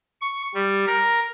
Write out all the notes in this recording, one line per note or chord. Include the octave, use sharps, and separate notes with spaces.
C#6
G3
A#4